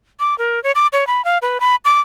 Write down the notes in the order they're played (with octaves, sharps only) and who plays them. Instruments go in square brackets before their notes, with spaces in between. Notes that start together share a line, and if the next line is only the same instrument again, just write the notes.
[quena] D6
A#4
C#5
D6
C#5
B5
F5
B4
B5
D6